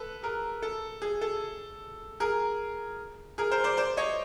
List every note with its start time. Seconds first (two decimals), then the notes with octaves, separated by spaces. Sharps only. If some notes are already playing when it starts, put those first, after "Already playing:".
Already playing: A4 B4
0.23 G#4 A#4
0.62 A4
1.02 G#4
1.21 A4
2.20 G#4 A#4
3.38 G#4 A#4
3.51 A#4 C5
3.64 C5 D5
3.77 C5 D5
3.97 C#5 D#5